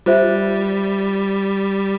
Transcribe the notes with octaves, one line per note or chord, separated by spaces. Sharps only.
G3 F4 C5 E5